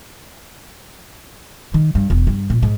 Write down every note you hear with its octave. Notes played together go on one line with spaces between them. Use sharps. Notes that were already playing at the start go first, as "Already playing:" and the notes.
D#3
G2
E1
G2
A#2
G#2